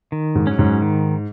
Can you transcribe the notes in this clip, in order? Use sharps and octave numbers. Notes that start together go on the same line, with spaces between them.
D#3
G#2
F#3 C#4
G#2
D#3